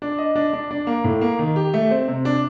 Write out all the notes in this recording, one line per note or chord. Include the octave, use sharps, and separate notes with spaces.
D4
D#5
D4
D4
D4
A#3
A2
A#3
D#3
G4
A3
C4
C3
D4